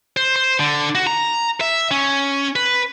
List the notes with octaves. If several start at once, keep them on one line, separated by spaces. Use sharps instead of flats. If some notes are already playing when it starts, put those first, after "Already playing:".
C5
C5
D3
F#4
A#5
E5
C#4
B4